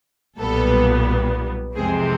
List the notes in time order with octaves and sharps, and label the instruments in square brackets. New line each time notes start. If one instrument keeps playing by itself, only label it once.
[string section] B1 A#2 G3 B3 A4
F2 C3 E3 G#3 C4 G#4